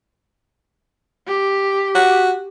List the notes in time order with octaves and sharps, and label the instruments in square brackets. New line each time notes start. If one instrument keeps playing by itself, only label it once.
[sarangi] G4
[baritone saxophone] F#4